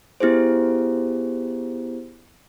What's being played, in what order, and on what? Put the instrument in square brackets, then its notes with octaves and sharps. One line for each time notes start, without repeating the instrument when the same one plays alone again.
[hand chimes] B3 E4 G4 G#4 C5